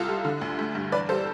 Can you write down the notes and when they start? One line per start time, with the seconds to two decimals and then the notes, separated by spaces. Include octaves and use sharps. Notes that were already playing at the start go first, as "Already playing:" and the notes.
Already playing: C2 F4 A4
0.08 G3
0.25 D3
0.42 D2
0.59 A3
0.75 G2
0.92 E2 B4 D5
1.09 G3 A4 C5